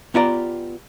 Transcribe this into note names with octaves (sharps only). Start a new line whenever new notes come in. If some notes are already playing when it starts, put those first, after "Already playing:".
B3 E4 F4 G4 D5 A#5